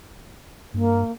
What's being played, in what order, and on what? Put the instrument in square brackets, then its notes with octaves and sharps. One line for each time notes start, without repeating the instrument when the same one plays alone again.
[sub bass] G2 [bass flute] A#3